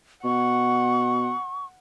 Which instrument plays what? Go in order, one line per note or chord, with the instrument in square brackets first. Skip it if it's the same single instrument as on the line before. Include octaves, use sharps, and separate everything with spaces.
[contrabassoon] B2 [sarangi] F#5 [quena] C#6